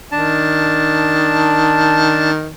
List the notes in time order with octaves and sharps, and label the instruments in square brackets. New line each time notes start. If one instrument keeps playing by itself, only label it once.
[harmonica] D#3 [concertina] D4 A5